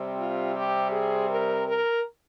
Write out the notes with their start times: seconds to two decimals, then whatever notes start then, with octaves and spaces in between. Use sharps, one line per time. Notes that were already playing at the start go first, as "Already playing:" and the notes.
Already playing: C3 G3 C4
0.18 F4
0.55 G4
0.92 G#4
1.30 A#4
1.67 A#4